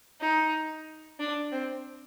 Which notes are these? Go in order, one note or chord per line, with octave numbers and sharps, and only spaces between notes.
D#4
D4
C4